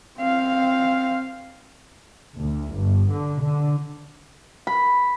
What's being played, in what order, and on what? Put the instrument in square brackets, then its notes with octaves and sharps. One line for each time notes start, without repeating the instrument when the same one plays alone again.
[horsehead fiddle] C4 F5
[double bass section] D2
G1
D3
D3
[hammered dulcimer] B5